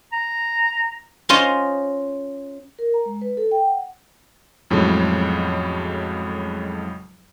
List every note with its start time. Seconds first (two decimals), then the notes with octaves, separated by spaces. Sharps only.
0.13 A#5
1.29 C#4 F4 C5 D#5
2.79 A#4
2.94 A#5
3.05 G#3
3.22 B4
3.37 A4
3.51 G5
3.65 F#5
4.70 F2 A2 C#3 F#3 G#3